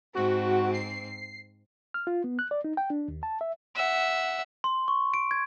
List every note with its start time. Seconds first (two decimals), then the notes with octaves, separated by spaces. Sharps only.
0.15 G#2 C4 F#4
0.73 C7
1.94 F6
2.07 F4
2.24 B3
2.39 F#6
2.51 D5
2.64 D#4
2.77 G5
2.90 D4
3.08 D#2
3.23 A5
3.41 E5
3.76 E5 F#5
4.64 C6
4.88 C#6
5.14 D7
5.31 G#6